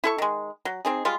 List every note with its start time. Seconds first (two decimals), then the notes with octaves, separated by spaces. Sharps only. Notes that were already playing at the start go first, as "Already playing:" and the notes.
0.04 E4 A4 C#6
0.18 D#3 G#3
0.65 F#3
0.85 C4 D#4 G#4
1.05 G3 G#3 F4